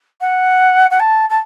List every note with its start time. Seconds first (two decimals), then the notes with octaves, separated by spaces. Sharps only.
0.20 F#5
0.90 F#5
0.99 A5
1.29 A5